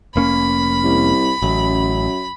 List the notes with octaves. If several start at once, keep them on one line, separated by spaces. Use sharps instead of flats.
F1 A#3 C#4 B5
C2
A1 F#2